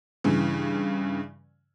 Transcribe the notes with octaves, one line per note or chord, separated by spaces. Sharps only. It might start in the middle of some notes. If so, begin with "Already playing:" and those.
G2 C#3 E3